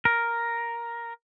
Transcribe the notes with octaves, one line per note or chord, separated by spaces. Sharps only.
A#4